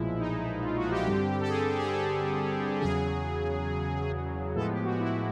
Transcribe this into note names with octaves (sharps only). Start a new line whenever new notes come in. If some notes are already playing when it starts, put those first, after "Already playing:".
Already playing: B1 A#2 F3 G#3 E4
D#4
E4
F4
F#4
G4
G2 D3 G3 C4
A4
G#4
A4
G#4
A4
E2 C#3 F#3 G#4
G#4
A2 F3 G#3 B3 A4
G4
F#4
E4